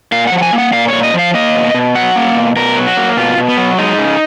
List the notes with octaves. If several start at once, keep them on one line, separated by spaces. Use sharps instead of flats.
A#2 F5
F#5
F3
F#5
G#5
A#3
F#5
A#2 F5
A#2 C#5
D#5
F3
F5
A#3 D#5
B2
B2
F#3 F#5
A#3
B2
B2 A#4
F#3
F#4
A#3
B2 F4
B2
B3
F#3
G#3 D#4
C#3